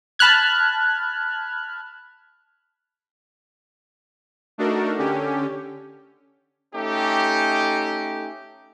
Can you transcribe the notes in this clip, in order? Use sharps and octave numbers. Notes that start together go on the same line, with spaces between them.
A5 B5 F6 F#6 G#6
A3 D4 D#4 F#4 A4 A#4
D3 C#4 G4
A3 C#4 D#4 G4